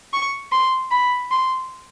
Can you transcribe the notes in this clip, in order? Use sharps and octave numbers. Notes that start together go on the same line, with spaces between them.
C#6
C6
B5
C6